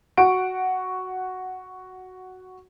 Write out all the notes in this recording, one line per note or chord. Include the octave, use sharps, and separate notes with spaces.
F#4 F#5 C#6 D7